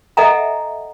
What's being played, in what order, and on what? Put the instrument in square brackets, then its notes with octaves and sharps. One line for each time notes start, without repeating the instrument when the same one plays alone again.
[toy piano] A4 D#5 E5 F#5 G#5 A#5